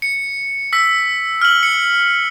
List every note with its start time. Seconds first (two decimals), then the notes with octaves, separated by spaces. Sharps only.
0.02 C#7
0.73 E6 B6
1.41 F6 F#7
1.63 C#7